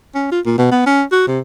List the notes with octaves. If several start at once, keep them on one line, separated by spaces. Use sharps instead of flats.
C#4
F4
A#2
B2
B3
C#4
F#4
C3